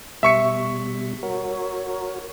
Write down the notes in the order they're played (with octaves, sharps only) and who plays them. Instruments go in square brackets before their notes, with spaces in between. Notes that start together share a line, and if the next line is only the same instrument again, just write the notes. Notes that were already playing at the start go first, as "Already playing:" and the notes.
[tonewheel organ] B2 G3 [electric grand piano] E5 C#6 C#7
[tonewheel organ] F#4 A#4 C#5